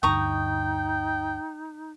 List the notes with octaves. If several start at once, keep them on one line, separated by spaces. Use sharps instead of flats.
D2 G2 D3 D#4 G5 A#5 C#6 D#6